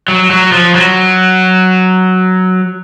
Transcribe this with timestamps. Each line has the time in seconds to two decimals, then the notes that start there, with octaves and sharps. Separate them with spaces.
0.08 F#3
0.31 F#3
0.52 F3
0.75 F#3